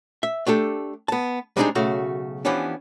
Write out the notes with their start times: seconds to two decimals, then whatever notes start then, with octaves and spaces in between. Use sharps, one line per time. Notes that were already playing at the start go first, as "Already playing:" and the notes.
0.23 E5
0.47 A3 D4 G4 A4
1.08 B3 A5
1.57 G3 G#3 C4 D4 D#4 G#4
1.75 B1 C#3 A3 F#4
2.45 E3 F3 B3 C#4 D4 G4